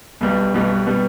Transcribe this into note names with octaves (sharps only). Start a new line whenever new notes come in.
B1 B2 G3 B3
B1 B2 G3 B3
B2 G3 B3